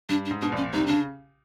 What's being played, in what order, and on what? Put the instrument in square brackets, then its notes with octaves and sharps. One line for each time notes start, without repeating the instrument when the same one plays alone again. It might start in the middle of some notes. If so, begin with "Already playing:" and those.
[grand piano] G2 [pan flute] D4
[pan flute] D4
[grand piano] G#2
[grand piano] B2 [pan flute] D4
[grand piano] A#1 A#2 [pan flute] C#4
[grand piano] C2 C3 [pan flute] D#4
[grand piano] C#3 [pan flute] D4